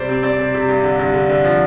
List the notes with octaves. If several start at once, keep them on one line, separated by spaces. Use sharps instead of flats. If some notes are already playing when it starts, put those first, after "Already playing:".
Already playing: C3 G3 C5 D5
C4
C4 D5
C3
C3
G2
D3
G2
D3
D3
F3